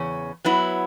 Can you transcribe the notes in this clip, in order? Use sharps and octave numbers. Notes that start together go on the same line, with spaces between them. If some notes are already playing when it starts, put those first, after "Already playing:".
Already playing: E2 C#3 C#4
F#3 B3 E4